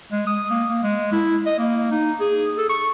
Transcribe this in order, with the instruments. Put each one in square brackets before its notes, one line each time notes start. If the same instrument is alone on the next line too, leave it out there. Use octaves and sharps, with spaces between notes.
[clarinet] G#3
D#6
A#3
A#3
G#3
E4
D#5
A#3
D#4
G#4
A4
C#6